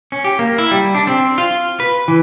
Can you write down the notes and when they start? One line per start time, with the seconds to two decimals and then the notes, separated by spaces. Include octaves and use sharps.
0.12 C#4
0.24 G4
0.39 A#3
0.58 E4
0.71 G3
0.95 D4
1.07 C4
1.38 F4
1.80 B4
2.08 E3